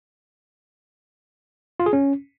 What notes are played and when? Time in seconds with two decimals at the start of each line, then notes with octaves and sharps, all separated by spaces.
1.80 F4
1.86 G#4
1.93 C#4